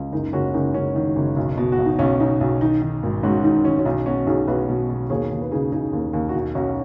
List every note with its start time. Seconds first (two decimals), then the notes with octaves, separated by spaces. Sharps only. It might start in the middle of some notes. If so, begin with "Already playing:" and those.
Already playing: C#2
0.12 F#1 D#4
0.33 F#1 C#4 F#4
0.54 F#1 D#4
0.74 F#1 C#4
0.96 D#3
1.16 F#1
1.36 B1
1.57 B2
1.72 F#4
1.78 B1
1.85 D#4
1.99 B1 C#4
2.20 B1 D#4
2.41 B1
2.61 D#3 D#4
2.82 D#3
3.03 G#1
3.23 G#2 C#4 F#4
3.44 D#3 D#4
3.65 D#3 C#4
3.79 C#4
3.86 B1 D#4
4.06 B2 C#4 F#4
4.27 B1 D#4 G#4
4.47 B1 F#4 B4
4.69 B2
4.89 B2
5.10 D#2 G#4 C#5
5.31 D#2
5.42 B4
5.51 C#3 D#4 G#4
5.72 C#3 D#4 G#4
5.93 D#2
6.13 D#2
6.29 F#4
6.34 B1 D#4
6.55 B1 C#4 F#4